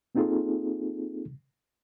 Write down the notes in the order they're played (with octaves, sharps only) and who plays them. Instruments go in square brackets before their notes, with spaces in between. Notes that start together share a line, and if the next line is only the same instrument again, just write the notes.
[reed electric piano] A#3 C4 D#4 F4 G#4 A4